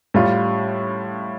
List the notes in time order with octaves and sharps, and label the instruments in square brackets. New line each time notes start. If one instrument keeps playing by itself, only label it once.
[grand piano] A2 G3 F4